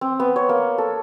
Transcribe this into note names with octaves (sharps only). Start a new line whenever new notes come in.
C4
B3
C#5
A#3
A4